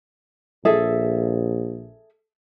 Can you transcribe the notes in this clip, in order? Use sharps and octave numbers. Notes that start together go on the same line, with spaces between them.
A#1 G#4 A4 E5